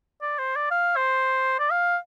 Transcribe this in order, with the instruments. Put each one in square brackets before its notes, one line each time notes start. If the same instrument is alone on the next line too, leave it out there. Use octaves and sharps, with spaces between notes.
[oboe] D5
C5
D5
F5
C5
D5
F5